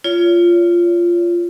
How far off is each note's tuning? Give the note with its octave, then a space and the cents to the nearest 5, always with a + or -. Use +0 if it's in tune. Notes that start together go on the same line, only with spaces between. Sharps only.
F4 -10 C#5 +30